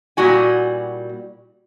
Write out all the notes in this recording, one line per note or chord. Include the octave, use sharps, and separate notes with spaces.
A#2 G3 E4 F#4 G#5